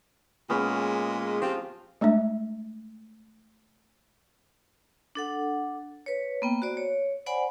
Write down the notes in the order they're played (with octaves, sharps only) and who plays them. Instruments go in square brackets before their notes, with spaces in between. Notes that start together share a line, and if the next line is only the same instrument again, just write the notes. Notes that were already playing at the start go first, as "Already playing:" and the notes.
[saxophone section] A#2 G#3 [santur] B3 C#4 G#4
[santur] F3 [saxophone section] C4 F4 G4
[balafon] G#3 A3 D4 E5
[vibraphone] D4 A4 F#5
B4 C#5
A#3 B3 G5
F#4 C5 D5
C#5
C5 D5 F#5 G#5 B5